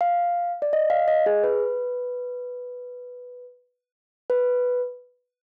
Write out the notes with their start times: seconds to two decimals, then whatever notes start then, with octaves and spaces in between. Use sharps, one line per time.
0.01 F5
0.62 D5
0.73 D#5
0.90 F5
1.08 D#5
1.26 G#4
1.44 B4
4.30 B4